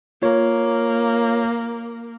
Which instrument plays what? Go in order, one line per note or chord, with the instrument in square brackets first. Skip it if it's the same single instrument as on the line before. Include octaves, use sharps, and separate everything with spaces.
[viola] A#3 [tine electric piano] F4 C#5